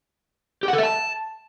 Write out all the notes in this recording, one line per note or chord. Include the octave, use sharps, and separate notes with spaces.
G4
F#5
A4
E5
A5